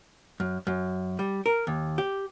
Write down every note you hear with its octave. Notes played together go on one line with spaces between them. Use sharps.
F#2
F#2
G3
A#4
D#2
G4